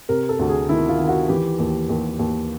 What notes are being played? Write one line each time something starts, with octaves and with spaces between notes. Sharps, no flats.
C3 A#4
A4
D2
G#4
D#3 E4
F4
D#3
F#4
E3 G4
D#2
D#2
D#2